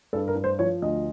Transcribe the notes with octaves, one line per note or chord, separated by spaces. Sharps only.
G2 A4
A#4
G2
C5
F3 C#5
D2 D#5